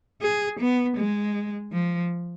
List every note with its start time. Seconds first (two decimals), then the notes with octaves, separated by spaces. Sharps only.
0.22 G#4
0.60 B3
0.97 G#3
1.72 F3